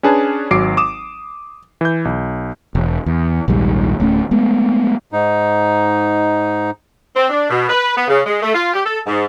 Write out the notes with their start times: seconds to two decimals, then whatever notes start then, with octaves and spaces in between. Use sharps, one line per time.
0.03 C#4 D4 G#4 B4 A5
0.51 G#1 F#3 D6 C7 D7
0.77 D6 D#6 E7
1.81 E3 G6
2.05 B1
2.75 E1
3.06 E2
3.48 A#1 D#2 G#2 G3
4.00 D1 A3 C#4
4.31 G#3 A3 B3
5.12 G#2 D#4
7.16 C4
7.30 D4
7.50 B2
7.70 B4
7.96 B3
8.08 C#3
8.26 G#3
8.42 A3
8.55 F4
8.73 G4
8.85 A4
9.07 G#2